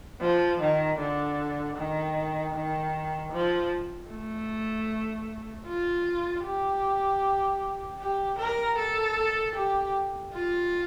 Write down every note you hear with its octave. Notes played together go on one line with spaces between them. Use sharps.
F3
D#3
D3
D#3
D#3
F3
A3
F4
G4
G4
A#4
A4
G4
F4